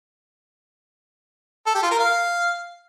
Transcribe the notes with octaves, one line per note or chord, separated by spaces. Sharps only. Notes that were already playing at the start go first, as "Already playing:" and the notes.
A4
G4
F4
A#4
F5